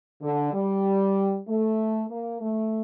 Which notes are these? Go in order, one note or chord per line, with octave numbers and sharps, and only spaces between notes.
D3
G3
A3
A#3
A3